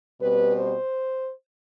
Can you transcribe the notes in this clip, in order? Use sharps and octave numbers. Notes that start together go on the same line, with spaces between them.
B2 G3 C4 B4
C5